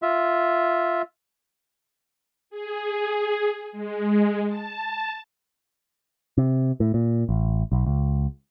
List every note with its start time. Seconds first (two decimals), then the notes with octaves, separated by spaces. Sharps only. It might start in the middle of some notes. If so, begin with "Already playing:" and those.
0.02 F4 E5
2.50 G#4
3.72 G#3
4.48 A5
6.38 C3
6.80 A2
6.94 A#2
7.29 A1
7.72 B1
7.86 C#2